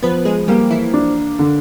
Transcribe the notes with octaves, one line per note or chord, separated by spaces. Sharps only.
F3 B3 B4
G#3 G#4
G3 A#3 G4
E3 E4
D4
D3